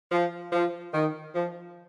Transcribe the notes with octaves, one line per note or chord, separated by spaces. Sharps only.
F3
F3
D#3
F3